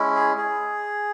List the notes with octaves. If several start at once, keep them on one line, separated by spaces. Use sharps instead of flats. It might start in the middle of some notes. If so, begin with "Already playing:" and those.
Already playing: G#3 C#4 E4
G#4
G#4